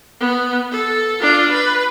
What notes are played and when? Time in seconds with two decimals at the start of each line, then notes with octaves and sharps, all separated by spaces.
0.20 B3
0.71 A4
1.21 D4 F4
1.50 B4